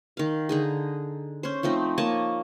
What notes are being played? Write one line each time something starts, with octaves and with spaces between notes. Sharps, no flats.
D#3 F5
D3 D#4 G#4
C#4 C5
F3 A3 C4 D#4
A#3 C#5 D#5 A5